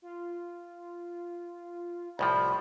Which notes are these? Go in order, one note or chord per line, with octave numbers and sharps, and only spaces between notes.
F4
C2 A2 F3 B5